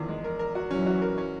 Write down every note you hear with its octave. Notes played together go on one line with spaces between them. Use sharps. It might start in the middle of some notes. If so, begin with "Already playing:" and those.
Already playing: E2 D#3 F3
G#3
A#4
A#4
F#4
E3 F#3 C#4
F#4
A#4
C#4